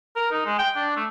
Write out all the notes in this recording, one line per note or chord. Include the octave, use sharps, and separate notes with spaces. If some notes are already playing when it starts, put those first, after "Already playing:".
A#4
D#4
G#3
G5
D4
A3